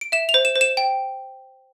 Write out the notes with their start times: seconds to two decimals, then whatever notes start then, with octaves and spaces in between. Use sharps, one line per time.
0.01 D7
0.12 E5 E7
0.29 F7
0.34 C5
0.45 E7
0.55 C5
0.61 E7
0.77 G5